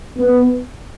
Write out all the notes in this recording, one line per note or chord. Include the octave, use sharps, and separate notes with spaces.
B3